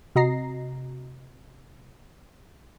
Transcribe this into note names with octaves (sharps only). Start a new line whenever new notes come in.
C3 F#4 D#5 A#5 A#6 C7